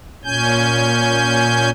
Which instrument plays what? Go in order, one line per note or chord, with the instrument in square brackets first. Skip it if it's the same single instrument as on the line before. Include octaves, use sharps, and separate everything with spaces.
[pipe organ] A#2 C#4 G#5 G6